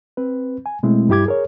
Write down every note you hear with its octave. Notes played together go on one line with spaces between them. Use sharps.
C4 B4
G#5
B2 G#3 A3 C4 E4
G2 G3 E4 G4 D6 G#6
G#4 A#4 C#5